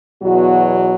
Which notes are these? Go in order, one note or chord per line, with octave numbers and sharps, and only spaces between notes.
E2 B2 F#3 F#4